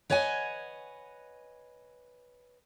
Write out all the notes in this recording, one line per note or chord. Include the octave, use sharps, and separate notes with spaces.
B4 C#5 D#5 F#5 G#5